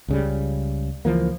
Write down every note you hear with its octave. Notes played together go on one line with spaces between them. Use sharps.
C#2 C#3 G3
C#2 E3 F3 A#3